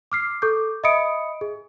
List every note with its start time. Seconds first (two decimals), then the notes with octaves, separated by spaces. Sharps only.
0.12 D6 F6 C7
0.42 A4 C#6 D6 G6
0.84 D#5 E5 B5 D#6 C#7 D7
1.41 G#4